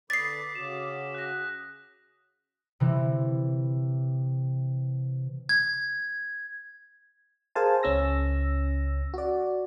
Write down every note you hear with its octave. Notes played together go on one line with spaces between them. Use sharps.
D3 B4 D6 D#6 A6 B6 C7
C#3 C#4 F#4 E7
F#6 A#6
C3 E3
G#6
G#4 A#4 C5 F5 G#5 A5
C#2 C#3 C#4 E6 A#6
F#4 D5